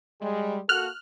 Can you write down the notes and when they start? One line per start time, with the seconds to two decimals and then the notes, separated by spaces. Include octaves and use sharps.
0.21 G3 G#3
0.69 A#3 F#4 A4 F6 F#6